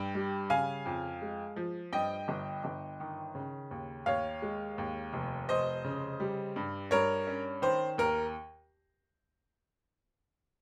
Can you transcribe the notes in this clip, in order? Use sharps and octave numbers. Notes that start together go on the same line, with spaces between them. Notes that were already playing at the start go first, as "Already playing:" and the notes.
Already playing: G2 G5
G3
C#3 F5 G#5
F2
G#3
F3
G2 D#5 G5
G1
G1
D#3
C#3
D#2
D#2 C#5 F5
G#3
D#2
F1
F1 C5 D#5
C#3
G3
G2
G2 A#4 C#5
C#4
D#3 C5
D#2 A#4